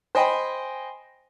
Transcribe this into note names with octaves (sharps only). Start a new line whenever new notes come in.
C5 D#5 G5 G#5 B5